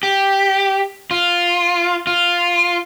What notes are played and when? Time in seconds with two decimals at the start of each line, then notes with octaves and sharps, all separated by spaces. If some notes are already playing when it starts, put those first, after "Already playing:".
0.03 G4
1.11 F4
2.07 F4